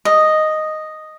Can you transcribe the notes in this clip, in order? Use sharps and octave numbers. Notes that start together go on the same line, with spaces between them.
D#5